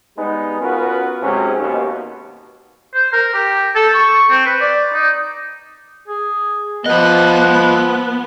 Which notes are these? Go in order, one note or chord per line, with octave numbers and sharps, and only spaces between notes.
G3 G#3 B3 D#4
B3 C#4 F4 F#4 A#4 B4
G#2 C3 F#3 G#3 C#4
D#2 B2
C5
A#4
G4
A4
C#6
C4
B4
D5
D#4
G#4
F3 B3 F4 D#5 F#6